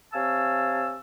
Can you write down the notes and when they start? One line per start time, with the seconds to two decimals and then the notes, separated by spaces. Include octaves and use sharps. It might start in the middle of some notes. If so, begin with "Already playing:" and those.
0.13 C3 C#5 F5 G#5 A5 E6